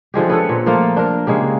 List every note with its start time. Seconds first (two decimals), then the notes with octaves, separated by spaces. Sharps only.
0.14 D3 F3 G#3 G4
0.29 B3 C#4 A4 F#5
0.49 A#2 C5
0.66 F3 A3 A#3 F4
0.96 D4 A#4
1.27 C#3 G#3 A#3 G4